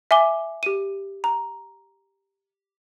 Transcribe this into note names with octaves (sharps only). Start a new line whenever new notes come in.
E5 G#5 D6 G7
G4 D#7
A#5